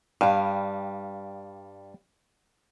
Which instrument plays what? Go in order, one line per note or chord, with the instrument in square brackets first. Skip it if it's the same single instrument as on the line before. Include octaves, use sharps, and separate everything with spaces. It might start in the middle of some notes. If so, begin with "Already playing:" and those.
[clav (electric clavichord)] G2 [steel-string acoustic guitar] G3 F5